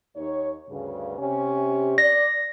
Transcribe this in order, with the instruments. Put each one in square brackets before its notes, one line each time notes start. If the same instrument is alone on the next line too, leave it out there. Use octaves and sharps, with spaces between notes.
[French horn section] D#2 D#4 C#5
D2 G2 C#3
C3 C#4 G4
[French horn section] D5 [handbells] A#6